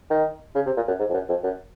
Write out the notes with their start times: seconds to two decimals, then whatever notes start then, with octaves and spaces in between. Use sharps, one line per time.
0.11 D#3
0.55 C#3
0.66 C3
0.77 A#2
0.88 F#2
0.99 G#2
1.10 F2
1.14 F#2
1.29 F2
1.43 F#2